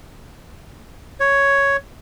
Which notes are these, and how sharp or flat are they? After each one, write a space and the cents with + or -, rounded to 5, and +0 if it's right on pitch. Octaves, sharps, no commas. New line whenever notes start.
C#5 +5